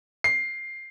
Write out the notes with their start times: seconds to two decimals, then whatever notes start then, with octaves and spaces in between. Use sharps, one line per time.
0.24 C7